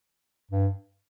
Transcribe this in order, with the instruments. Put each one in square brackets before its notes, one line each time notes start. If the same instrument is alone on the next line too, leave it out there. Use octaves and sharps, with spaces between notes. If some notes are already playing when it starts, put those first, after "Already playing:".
[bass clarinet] G2